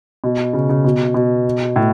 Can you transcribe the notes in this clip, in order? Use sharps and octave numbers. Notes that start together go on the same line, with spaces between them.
B2
C#3
C#3
B2
B2
A2